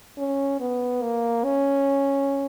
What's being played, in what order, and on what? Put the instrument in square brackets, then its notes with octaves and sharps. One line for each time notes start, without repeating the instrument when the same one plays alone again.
[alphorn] C#4
B3
A#3
C#4